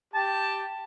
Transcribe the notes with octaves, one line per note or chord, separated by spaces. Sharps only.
G4 G5 A5